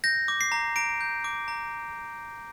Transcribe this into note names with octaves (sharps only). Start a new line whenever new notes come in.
G6 A#6
D6
C7
A#5
A#5 D7
G6
D6
A#5